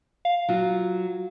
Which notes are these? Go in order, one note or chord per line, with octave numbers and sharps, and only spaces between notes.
F5
F#3 F4